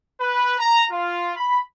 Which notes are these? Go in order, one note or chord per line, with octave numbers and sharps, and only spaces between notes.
B4
A#5
F4
B5